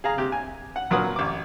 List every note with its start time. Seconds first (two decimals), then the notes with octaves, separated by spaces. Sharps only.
0.04 G#4 F5 A#5
0.18 C3 G4
0.32 G#5
0.76 F#5
0.91 A#2 F#3 A#4 B4 F#5 D#6
1.16 A1 D6